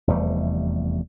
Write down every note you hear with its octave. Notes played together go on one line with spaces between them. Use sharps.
F1 E2 G3 A3